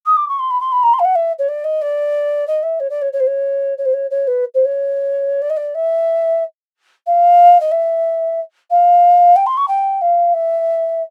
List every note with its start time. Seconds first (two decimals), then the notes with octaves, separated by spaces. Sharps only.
0.06 D#6
0.17 D6
0.28 C#6
0.39 C6
0.50 B5
0.60 C6
0.72 B5
0.83 A#5
0.93 C6
0.99 F5
1.05 F#5
1.15 E5
1.38 C#5
1.48 D5
1.64 D#5
1.81 D5
2.47 D#5
2.63 E5
2.80 C#5
2.90 D5
3.01 C#5
3.13 C#5
3.20 C5
3.27 C#5
3.78 C#5
3.85 C5
3.93 C#5
4.10 C#5
4.27 B4
4.54 C5
4.65 C#5
5.42 D5
5.50 D#5
5.57 D5
5.74 E5
7.06 F5
7.60 D#5
7.71 E5
8.70 F5
9.36 G5
9.46 C6
9.57 C#6
9.68 G5
10.01 F5
10.33 E5